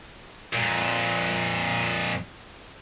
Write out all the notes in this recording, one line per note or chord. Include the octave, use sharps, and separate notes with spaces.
F2 A#2